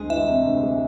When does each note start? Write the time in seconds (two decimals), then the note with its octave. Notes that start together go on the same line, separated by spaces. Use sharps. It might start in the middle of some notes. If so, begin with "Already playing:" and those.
Already playing: D2 G#3 D#5
0.09 E3 E5
0.27 C3
0.45 D2
0.63 G#3